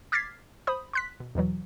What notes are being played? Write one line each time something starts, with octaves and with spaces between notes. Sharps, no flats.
D6 F6 G#6 A6 B6 C7
C5 B5 D#6
C6 F#6 B6
B2
E2 B2 E3 F#3